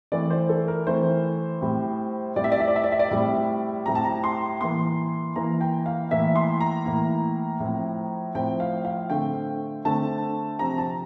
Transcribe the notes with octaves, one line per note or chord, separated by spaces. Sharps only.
E3 A3 C4 D5
C5
A4
A#4
E3 A3 C4 C5
A2 G3 C4
A2 G3 C4 D5
E5
D5
E5
D5
E5
D5
E5
D5
A2 G3 C4 E5
A2 G3 C4 A#5
A5
A#5
C6
E3 A#3 C6
E3 A#3 A#5
G5
F5
A2 E3 A#3 E5
C6
A#5
A2 E3 A#3
A2 F3 C4
A2 F3 C4 G5
F5
F5
D3 A3 C4 G5
D3 A3 C4 A5
C3 F3 C4 A#5
A5